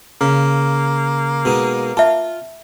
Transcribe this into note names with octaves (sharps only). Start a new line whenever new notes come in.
C#3 A#3
B2 G#3 D#4
F4 E5 A5